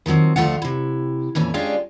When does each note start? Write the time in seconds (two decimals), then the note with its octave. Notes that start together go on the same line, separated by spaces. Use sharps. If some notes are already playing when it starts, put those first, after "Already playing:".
0.06 D#3 F3 F#3 C4
0.36 D2 F3 A3 F4 F#5
0.62 C3 E4
1.35 F2 A#2 E3 C#4
1.54 G#3 C#4 D4 F4 G4